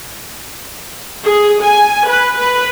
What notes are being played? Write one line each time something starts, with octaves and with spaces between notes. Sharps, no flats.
G#4
G#5
B4
B4